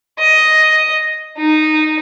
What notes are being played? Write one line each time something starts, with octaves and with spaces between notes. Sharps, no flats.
D#5
D#4